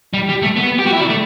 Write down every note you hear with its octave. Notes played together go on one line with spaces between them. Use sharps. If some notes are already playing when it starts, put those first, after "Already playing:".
G3
G3
A3
B3
G4
F#4
E4
D4
A3